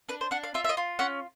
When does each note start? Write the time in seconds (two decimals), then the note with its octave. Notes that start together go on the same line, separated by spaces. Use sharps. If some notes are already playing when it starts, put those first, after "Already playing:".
0.09 D4 B4
0.21 C5
0.31 D4 F#5
0.43 F5
0.54 F4 E5
0.64 E5
0.69 D#5
0.77 F4
0.99 C#4 F#5